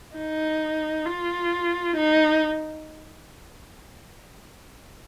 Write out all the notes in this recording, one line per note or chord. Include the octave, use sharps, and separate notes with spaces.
D#4
F4
D#4